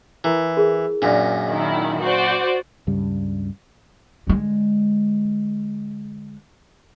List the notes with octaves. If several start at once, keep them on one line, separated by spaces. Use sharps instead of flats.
E3 E4 A#4
G#4 A#4
F#2 A#2 D4 D5
D#3 E4 D#5
F#4 C5 D5
C#2 G2 C#3 G3
D3 G#3